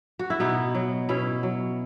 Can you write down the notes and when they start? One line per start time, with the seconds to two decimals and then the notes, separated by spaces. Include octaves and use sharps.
0.19 F#4
0.30 E4
0.40 B2 B3 D#4
0.75 F#3
1.09 B2 C#4 E4
1.43 F#3